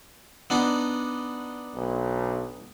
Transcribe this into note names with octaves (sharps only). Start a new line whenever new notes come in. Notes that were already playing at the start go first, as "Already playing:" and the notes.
B3 D4 D#4
B1